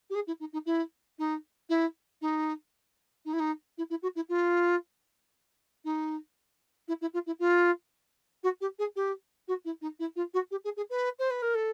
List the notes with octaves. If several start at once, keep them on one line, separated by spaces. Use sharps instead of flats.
G4
G#4
E4
D#4
D#4
E4
D#4
E4
D#4
D#4
E4
D#4
E4
E4
F#4
E4
F4
D#4
E4
E4
F4
E4
F4
F#4
G4
G#4
G4
F#4
E4
D#4
E4
F4
F#4
G4
G#4
G#4
B4
C5
B4
A#4
A4